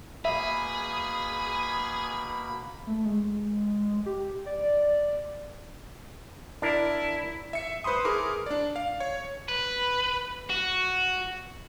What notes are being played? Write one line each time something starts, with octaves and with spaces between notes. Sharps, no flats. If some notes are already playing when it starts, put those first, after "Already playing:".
B2 A#3 G#4 E5 B5
A3
G#3
G4
D5
D4 E4 A#4
E5 C#7
B4 C5 B5 C6 D#6
E4 G#4 A#4 D6
D4 D5
F5
C#5
B4
F#4